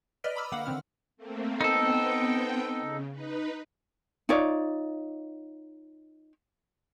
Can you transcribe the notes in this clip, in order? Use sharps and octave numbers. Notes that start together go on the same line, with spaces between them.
B4 D5 D#5 F6 B6 D7
A#5 B5 D6 E6 F6
D3 A#3 F5 F#5 F#7
D3 D#3 C4 F6
A3 A#3 C4
B3 C4 D#4 A4 G5
C#3
D#4 B4
D#4 F4 C#5 D5